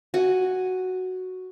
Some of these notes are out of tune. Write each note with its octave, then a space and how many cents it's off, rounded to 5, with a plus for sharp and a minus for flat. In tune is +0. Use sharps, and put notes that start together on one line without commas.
F#4 +0 G#5 +0